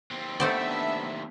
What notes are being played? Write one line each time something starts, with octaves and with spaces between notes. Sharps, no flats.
D#2 C4
A3 B3 D4 C5 D5 E5